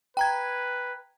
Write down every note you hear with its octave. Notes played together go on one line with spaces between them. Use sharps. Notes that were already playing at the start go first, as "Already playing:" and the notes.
B4 G5 A#5 G#6